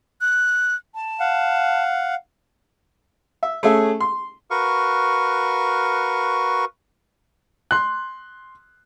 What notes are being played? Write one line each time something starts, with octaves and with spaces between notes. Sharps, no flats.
F#6
A5
F5 F#5
E5
A3 C#4 G#4 E5
C6
F#4 A#4 B4 F5 C#6
C6 F#6